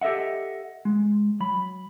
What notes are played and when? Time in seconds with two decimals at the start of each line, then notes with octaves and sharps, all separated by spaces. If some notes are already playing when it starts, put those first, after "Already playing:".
0.01 G4 A4 D#5 E5 F#5
0.85 G#3
1.40 F#3 B5